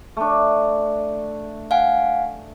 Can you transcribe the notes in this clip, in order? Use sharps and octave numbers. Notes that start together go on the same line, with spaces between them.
A3 D4
F5 F#5 G#5